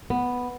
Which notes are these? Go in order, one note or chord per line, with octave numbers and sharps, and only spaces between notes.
B3